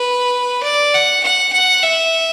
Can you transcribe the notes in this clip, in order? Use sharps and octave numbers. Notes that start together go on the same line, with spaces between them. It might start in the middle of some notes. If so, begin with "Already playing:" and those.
Already playing: B4
D5
F#5
F#5
F#5
E5